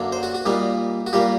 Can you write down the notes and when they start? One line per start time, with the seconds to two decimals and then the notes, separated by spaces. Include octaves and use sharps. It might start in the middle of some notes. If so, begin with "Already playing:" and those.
Already playing: F#2 D3 F#3 A#3 D4
0.12 C5
0.23 F#4
0.35 F#4
0.45 A#2 G3 A#3 D#4
1.07 F#4
1.13 A#2 G3 A#3 G4